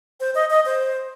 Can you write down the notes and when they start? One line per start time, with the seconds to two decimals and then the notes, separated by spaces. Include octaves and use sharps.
0.20 C5
0.35 D#5
0.50 D#5
0.66 C5